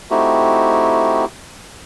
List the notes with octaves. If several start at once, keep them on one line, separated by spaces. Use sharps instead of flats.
A3 C4 D#4 E4 F#4 G4